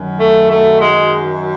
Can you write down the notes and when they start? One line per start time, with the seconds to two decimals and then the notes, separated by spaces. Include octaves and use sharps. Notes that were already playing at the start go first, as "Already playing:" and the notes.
Already playing: F#2 D#3 F#3
0.18 A3
0.47 A3
0.79 G#3